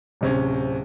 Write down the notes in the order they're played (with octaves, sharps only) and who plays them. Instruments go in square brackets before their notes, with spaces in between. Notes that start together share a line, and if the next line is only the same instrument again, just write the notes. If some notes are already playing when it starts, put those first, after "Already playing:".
[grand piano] D1 C3 C#4